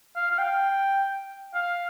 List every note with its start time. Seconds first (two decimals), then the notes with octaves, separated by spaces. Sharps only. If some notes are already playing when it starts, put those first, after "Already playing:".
0.16 F5
0.31 F5
0.39 G5
1.54 F5